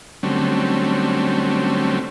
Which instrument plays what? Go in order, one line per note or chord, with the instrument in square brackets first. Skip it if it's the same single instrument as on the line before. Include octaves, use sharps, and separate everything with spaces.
[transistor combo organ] D3 F#3 G3 A3 C4 C#4